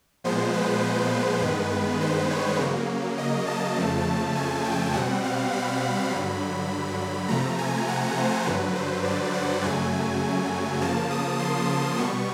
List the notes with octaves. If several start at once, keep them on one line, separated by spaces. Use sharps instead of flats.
A#2 F3 G#3 B3 C5
B4
G2 D#3 G#3 B3
C5
C#5
C#3 F#3 A#3
D#5
A5
F2 C#3 F3 A3
G#5
G5
B2 G3 C4 F#5
F5
B5
G2 D3 F#3
C3 F3 A3 A#5
G#5
F#5
C5
G2 D3 F#3 B4
C5
D5
F#5
F#2 C#3 F#3 A3 G#5
C#3 F3 A#3 A5
D#6
C6
B2 G3 B3 C#6